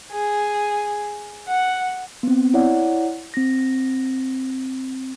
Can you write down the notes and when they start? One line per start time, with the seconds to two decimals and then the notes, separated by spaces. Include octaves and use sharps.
0.11 G#4
1.47 F#5
2.23 B3 C4
2.54 E4 C#5 D5 F#5
3.34 C4 A#6